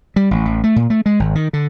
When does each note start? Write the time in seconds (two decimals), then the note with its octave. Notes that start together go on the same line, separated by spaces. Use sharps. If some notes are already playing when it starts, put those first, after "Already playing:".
0.16 G3
0.31 A1
0.46 A1
0.64 A3
0.76 A#2
0.90 A3
1.06 G#3
1.20 G#1
1.35 D#3
1.53 D3